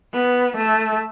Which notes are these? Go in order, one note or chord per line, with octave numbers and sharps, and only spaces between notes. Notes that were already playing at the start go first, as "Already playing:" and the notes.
B3
A3